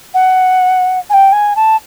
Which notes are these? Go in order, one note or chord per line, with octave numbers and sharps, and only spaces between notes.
F#5
G#5
G5
G#5
A5